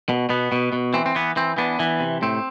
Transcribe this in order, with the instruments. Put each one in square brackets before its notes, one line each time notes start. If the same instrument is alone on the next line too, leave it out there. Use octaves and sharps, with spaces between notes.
[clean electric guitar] B2
B2 B3
B2
B2
E3 C4
C4
E3 B3
E3 C4
E3 B3 D4
E3
C3
A2 C4